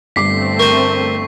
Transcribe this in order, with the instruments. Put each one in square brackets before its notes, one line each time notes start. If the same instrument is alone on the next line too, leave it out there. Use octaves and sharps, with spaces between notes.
[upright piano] G1 D6 [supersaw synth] A3 C4 [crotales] B6 C7
[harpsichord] A#4 C5 [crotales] C#6